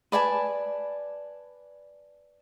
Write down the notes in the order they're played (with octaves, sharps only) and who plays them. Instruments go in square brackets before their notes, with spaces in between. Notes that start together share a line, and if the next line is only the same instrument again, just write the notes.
[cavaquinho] B4 D5 G#5 A5